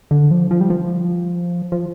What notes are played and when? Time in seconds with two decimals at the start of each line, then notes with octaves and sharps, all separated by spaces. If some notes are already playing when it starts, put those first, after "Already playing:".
0.11 D3
0.31 F3
0.51 F3
0.61 G3
0.70 F3
1.72 F3